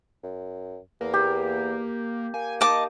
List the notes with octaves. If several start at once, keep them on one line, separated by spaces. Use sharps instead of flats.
F#2
E2 A#3
G4
A#3 G#5
A#3 D#4 D#5 A5 D6